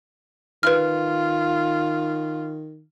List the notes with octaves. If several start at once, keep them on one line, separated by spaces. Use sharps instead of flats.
D#3 F4 B4 F6